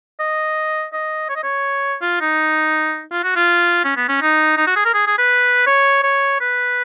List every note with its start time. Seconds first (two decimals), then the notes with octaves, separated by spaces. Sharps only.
0.20 D#5
0.93 D#5
1.29 C#5
1.36 D#5
1.43 C#5
2.02 F4
2.21 D#4
3.12 F4
3.23 F#4
3.36 F4
3.84 C#4
3.97 B3
4.09 C#4
4.22 D#4
4.57 D#4
4.67 F#4
4.76 G#4
4.85 A#4
4.94 G#4
5.07 G#4
5.18 B4
5.67 C#5
6.03 C#5
6.41 B4